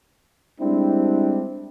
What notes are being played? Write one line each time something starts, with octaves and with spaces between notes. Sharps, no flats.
G3 G#3 C4 D4 E4